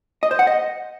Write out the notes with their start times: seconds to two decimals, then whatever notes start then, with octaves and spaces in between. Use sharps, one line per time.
0.23 D#5
0.31 C5
0.39 F#5
0.47 D#5